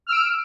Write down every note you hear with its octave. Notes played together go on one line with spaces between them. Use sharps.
E6 F6 D7